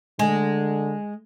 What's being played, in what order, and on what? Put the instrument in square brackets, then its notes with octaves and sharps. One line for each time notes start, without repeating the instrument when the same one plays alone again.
[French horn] D3 [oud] G#3